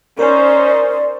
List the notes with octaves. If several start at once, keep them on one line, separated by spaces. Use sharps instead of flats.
C#4 D#4 A#4 C5 D5